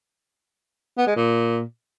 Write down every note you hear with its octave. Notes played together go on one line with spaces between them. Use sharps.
B3
G#3
A#2